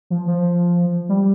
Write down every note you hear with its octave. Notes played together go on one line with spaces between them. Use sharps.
F3
F3
G3